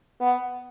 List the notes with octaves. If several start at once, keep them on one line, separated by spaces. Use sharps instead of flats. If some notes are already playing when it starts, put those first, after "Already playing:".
B3